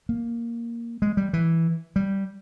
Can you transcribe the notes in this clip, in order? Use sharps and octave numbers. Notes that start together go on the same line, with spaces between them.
A#3
G#3
G3
E3
G3